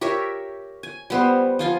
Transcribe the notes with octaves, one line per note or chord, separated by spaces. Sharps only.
G4 A#4 C#5 E5
G#5
G3 B3 C5
F3 F4 G#5